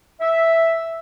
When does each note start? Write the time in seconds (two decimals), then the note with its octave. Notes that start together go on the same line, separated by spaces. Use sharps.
0.21 E5